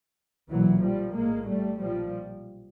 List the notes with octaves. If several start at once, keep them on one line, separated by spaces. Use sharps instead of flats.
B1 A#2 E3 F#3
F3 G3
A#1 A2 G#3 A#3
G3 A3
B1 A#2 F3 G3